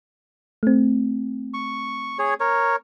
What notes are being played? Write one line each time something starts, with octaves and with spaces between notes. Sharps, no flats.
A3 C4
C#6
G#4 C#5
A#4 C#5